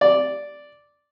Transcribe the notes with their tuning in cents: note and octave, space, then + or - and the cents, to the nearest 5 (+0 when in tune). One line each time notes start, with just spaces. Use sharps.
D5 -5